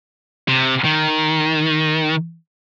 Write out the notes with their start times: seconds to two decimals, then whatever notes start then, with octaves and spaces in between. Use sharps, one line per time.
0.48 C3
0.85 D#3